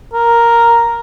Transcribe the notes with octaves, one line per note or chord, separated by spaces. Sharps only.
A#4